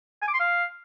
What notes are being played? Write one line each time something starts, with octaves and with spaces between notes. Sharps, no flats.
G#5
D6
C6
F5